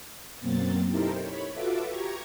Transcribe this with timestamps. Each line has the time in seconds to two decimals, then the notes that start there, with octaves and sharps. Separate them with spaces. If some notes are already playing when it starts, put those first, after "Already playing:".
0.40 F#2 B2 F#3 A#3 C4 A6
0.88 D#4 E4 G4 A4 A#4 C5
1.20 C#5 B5
1.51 F4 F#4 A4 B4 E5 D6
1.86 G4 A#5 C#6 G#6